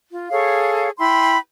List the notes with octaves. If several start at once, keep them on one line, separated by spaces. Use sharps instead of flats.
F4
G#4 A4 C#5 F5
E4 G5 B5 C6